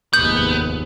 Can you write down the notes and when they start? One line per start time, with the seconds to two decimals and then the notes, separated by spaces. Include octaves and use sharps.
0.14 F1 D#2 G#2 B3 G6